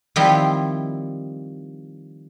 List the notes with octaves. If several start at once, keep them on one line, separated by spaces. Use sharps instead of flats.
D#3 F3 G3 C4 E4